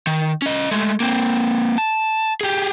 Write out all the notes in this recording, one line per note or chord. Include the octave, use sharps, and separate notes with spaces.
D#3
C#4 D#5
G#3 A3
A#3 C4
A5
G4 G#4